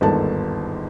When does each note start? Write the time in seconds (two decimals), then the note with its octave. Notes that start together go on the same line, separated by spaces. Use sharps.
0.01 G1 D#2 G#2 A4 A5